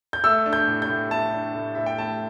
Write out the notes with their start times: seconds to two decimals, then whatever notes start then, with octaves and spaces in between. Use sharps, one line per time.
0.13 G6
0.24 A3 E6
0.46 D4
0.53 G6
0.67 A2
0.82 G6
0.89 A2
1.11 A3 A5
1.33 D4
1.55 A2
1.75 A2 E5
1.86 G5
1.98 A3 A5